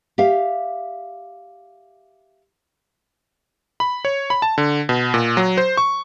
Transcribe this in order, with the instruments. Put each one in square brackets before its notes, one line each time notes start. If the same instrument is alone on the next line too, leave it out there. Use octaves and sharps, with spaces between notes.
[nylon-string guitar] G4 E5 F5
[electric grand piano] B5
C#5
B5
A5
D3
B2
A#2
F#3
C5
C#6